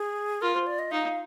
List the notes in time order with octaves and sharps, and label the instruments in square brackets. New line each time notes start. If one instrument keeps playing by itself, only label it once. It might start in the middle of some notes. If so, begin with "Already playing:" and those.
Already playing: [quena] G#4
[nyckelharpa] F4 [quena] A#4
[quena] C5
D5
D#5
[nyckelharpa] D#4 [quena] F5